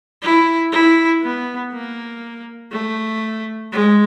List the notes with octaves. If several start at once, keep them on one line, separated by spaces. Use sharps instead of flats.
E4
E4
B3
A#3
A3
G#3